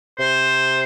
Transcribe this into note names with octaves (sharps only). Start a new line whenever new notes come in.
C3 C5